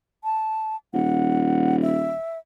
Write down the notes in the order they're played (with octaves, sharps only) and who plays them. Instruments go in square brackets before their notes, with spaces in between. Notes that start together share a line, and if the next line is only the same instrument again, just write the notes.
[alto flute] A5
[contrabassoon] D#1 [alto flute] F#5
[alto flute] E5